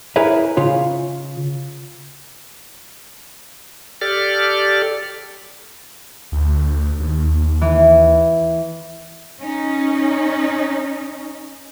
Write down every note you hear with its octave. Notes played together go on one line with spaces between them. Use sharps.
E4 G#4 A#4 B4 C#5 E5
C#3 F4 C#5
G4 A4 D5 F6
D2
D#2
E3
C#4 D#4